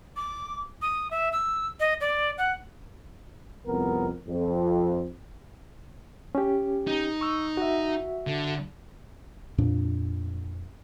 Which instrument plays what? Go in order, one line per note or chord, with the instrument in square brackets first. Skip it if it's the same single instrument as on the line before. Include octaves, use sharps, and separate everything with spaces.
[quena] D6
D#6
E5
E6
D#5
D5
F#5
[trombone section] C2 F2 B3 A#4
F2
[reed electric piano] C#4 G4
[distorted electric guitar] D#4
[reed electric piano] C#6 E6
F#4 E5
[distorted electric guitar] D3
[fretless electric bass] F2 A#2 D4